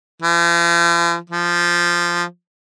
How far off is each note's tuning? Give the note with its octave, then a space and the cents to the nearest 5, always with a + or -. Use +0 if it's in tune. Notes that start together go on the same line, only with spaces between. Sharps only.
F3 -45
F3 -10